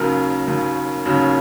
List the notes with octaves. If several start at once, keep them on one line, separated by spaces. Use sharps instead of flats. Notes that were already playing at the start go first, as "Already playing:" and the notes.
Already playing: D#2 C#3 F#3 A#4
D#2 C#3 F#3
D#2 C#3 F#3